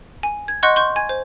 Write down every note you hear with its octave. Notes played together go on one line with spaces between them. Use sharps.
G#5
G#6
D#5 F#5 C6 C#6 F#6 G6
C6 C#6 G6
G#5 G#6
C5